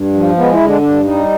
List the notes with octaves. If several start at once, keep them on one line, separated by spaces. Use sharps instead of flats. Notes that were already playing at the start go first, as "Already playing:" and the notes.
Already playing: G2
F3
G#3 B3
E4
D3
D4
G2 D4
G3 D#4